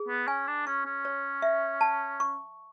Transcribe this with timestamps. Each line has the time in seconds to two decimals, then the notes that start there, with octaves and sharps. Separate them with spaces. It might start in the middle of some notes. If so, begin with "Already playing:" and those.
Already playing: G#4
0.08 B3
0.27 C#4 G#5
0.48 D4
0.67 C#4 C#6
0.85 C#4
1.05 C#5
1.42 E5
1.81 A5
2.20 C#6